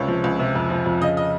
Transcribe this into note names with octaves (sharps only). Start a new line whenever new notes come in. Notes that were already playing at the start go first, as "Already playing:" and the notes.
Already playing: C#2 C3 C#5
F3
C#2
C3
F2
F3
F2
C#3 D#5
D#5